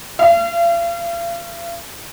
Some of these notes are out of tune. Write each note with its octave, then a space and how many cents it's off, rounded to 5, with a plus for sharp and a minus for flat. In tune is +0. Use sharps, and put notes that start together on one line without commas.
F5 -40